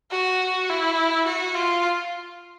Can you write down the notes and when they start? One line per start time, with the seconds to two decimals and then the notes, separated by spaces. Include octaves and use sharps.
0.11 F#4
0.69 E4
1.26 F#4
1.55 F4